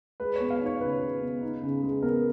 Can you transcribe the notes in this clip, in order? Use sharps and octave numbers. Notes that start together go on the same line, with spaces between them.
G#3 B4
B3 C#5
F5
D#4 C#5
C#3 B4
G#3
B3
D#4
C#3
G#3
B3 A#4